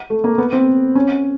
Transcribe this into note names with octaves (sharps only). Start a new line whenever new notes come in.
A3
A#3
B3
C4
C#4